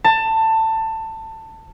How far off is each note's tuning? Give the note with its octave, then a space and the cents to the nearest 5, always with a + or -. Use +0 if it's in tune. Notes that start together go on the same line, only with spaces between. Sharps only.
A5 +20